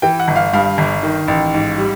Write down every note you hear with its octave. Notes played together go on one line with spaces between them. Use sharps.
E3 G5
F#5
G1
F5
G2 F5
G1
D#3
A1
G#2
G3